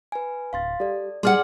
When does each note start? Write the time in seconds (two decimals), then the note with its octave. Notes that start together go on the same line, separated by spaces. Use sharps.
0.12 B4 G#5
0.53 D1 F5 C6 A6
0.80 G3 A4 D5
1.23 G3 G#4 D5 F#5 C6 D6 F6